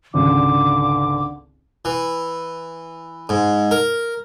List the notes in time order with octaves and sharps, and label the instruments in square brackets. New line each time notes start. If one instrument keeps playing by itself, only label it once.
[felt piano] G#1 C#2 [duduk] D3 [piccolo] D6
[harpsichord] E3
G#2
A#4